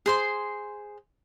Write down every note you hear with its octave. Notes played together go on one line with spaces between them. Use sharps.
G#4 C5 C6